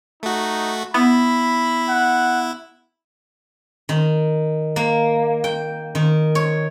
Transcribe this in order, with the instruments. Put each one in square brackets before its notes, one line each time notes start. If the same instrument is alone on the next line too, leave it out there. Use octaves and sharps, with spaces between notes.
[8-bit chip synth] A3 F#4 [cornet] D#4
[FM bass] B3 [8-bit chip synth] E4 [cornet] B5
[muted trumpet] F#5
[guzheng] D#3
A#3
G5
D#3
C#5